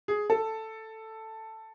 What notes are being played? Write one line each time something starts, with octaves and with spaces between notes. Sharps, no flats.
G#4
A4